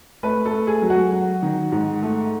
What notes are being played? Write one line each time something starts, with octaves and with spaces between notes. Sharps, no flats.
A3 B4
A4
A3
G#4
F#3
F#4
F#3
D#3
G#2
A3